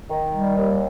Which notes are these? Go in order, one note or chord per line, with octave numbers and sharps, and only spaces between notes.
D#3
G3
D#2